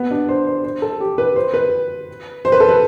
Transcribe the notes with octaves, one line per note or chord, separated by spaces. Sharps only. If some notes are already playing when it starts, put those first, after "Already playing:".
Already playing: B3
D4
C5
C5
C5
A4
G4
B4
C5
B4
C5
B4
A4
B4